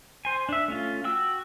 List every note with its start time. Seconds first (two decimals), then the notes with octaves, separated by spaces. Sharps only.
0.25 C5 G#5
0.49 D4 E5
0.68 A3 C#4 F4
1.04 F#4 G5 E6